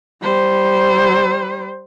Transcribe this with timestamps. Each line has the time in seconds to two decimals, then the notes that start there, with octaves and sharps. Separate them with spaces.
0.22 G3 C5